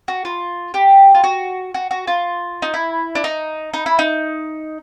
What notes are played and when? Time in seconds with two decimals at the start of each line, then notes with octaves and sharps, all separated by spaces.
0.08 F#4
0.25 F4
0.74 G4
1.15 F4
1.24 F#4
1.74 F#4
1.91 F#4
2.07 F4
2.62 D#4
2.74 E4
3.15 D4
3.24 D#4
3.74 D#4
3.86 E4
3.99 D#4